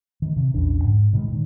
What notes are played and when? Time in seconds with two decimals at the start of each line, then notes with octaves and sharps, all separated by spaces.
0.22 D#3
0.36 C3
0.54 A#1 E2 C#3 D4
0.84 G#2
1.13 B2 D#3 G#3
1.28 A#2 D#3